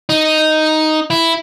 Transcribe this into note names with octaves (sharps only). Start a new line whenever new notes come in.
D#4
E4